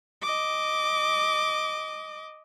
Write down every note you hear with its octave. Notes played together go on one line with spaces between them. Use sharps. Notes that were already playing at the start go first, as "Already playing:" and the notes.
D#5 D6